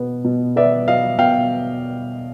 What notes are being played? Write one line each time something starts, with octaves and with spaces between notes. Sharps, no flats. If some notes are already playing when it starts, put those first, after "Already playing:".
Already playing: B2 B3
B2
B3 D5 E5
F#3 D#5 F5
B2 F5 G5